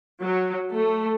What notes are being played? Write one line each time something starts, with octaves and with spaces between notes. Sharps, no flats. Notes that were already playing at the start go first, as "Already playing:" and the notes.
F#3
A3